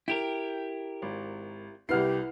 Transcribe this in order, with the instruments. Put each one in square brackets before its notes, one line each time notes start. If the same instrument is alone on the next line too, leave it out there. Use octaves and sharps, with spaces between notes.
[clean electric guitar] E4 G4 A#4 [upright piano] G5
[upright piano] G#1
[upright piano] C2 F6 C7 [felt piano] E4 B4 F#5 [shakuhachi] G4